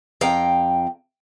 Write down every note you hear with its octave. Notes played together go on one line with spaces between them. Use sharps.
F2 F5 G5 A#5